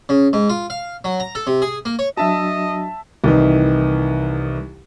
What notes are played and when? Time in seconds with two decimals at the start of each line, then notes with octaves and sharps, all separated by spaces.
0.09 C#3
0.33 G#2
0.49 F4
0.70 F5
1.04 F#3
1.20 A#5
1.35 A4
1.47 C3
1.62 G#4
1.85 A#3
1.99 C#5
2.17 F#3 D4 F#4 D#5 E5 A5
3.24 C2 D#3 E3 D#4